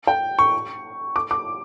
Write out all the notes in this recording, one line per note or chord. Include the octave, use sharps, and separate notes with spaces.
G5
C#6
D6
D6